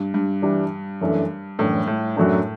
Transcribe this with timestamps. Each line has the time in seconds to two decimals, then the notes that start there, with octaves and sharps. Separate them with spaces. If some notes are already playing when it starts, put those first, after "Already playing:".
Already playing: G2
0.14 G2
0.42 E3 G3 D4 G4
1.01 F#2 E3 A3 D4 A4
1.59 F#2 A2 E3 A3 D4 A4
1.87 A2
2.16 F#2 A2 F#3 A3 D4